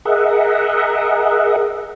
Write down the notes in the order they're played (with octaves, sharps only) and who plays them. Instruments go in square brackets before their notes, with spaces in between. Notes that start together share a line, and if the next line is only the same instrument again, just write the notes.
[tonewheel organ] G#4 A#4 D#5 E5 F#5